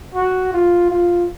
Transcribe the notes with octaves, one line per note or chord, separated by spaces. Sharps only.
F#4
F4
F4